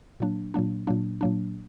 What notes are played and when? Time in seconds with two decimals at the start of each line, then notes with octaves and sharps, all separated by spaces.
0.20 A#2 F#3 A#3 D4
0.54 A#2 F#3 A#3 D4
0.87 A#2 F#3 A#3 D4
1.21 A#2 F#3 A#3 D4